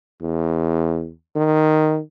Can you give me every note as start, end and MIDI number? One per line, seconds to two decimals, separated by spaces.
0.21 1.10 40
1.36 1.99 51